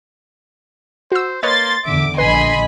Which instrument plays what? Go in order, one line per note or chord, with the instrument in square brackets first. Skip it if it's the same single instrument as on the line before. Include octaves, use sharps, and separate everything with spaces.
[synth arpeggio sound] F#4 E6 [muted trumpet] C5
[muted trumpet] A#3 [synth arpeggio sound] B4 C#5 D#5 [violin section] C6 A6
[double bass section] E2 D3 [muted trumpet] E5 [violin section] D6
[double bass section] A#1 D3 [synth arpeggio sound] B4 [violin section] D#5 G#5 B5 [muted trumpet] C6